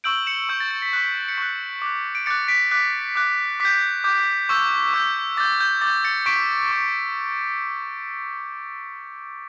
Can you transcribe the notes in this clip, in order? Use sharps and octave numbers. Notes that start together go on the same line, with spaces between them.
C#6 E6 G6 D7 F#7
C#7 E7
C#6 E6 G6
A6
A6
B6
C#6 F#6 B6
C#7
C#6 F#6 B6
D6 F#6
D7
D6 F#6 A6 C#7
B6 D7
D6 F#6 B6
D6 F#6
D6 G6 B6
D6 G6
C#6 E6 G6
C#6 E6 G6
D6 G6 A6
G6
D6 A6
G6
A6 C#7
C#6 G6 B6 D7
C#6 G6